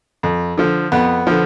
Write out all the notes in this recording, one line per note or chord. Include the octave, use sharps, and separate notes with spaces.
F2
D3 F3
F2 B3
D3 F3